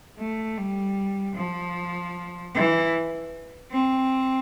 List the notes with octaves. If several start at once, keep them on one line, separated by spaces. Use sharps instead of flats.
A3
G3
F3
E3
C4